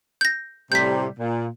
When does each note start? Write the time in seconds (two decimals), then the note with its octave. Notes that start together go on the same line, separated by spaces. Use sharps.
0.21 G6 A#6
0.72 A2 C3 G3 G6 B6
1.20 A#2